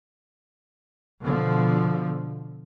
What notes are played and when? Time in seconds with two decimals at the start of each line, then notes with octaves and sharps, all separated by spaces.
1.22 B2 D3 F3